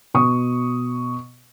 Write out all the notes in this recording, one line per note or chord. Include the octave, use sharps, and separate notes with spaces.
B2 C#6 D#6